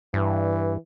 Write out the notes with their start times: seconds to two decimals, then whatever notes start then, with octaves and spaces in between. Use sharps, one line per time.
0.14 G2 E3